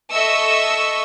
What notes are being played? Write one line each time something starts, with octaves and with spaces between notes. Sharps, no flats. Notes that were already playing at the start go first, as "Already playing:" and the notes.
A4 D#5 E5 C#6 E6